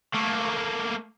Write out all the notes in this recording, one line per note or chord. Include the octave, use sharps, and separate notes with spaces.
A3 A#3